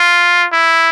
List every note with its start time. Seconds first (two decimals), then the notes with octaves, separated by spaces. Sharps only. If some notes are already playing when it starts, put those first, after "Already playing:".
Already playing: F4
0.53 E4